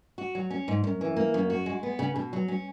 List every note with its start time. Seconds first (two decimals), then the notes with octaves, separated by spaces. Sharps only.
0.18 F#4
0.35 F#3
0.50 C#4
0.68 G#2
0.84 F#2
1.01 E3
1.17 A#3
1.34 F#2
1.50 F#4
1.66 G#3
1.83 B3
1.99 C#3
2.16 B2
2.33 F#3
2.48 C#4